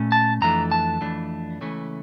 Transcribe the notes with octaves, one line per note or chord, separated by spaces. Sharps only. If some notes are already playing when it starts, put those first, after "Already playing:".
Already playing: A#2 A3 C#4
A5
F2 E3 A3 D4 A#5
A5
F2 E3 A3 D4
C#2 C#3 E3 A3 C#4